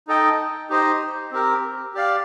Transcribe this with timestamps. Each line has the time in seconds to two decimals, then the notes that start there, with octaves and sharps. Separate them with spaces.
0.07 D#4 A4 D#5 G5
0.70 D#4 G4 C5 D#5
1.32 C4 G4 A#4
1.94 G4 D5 F5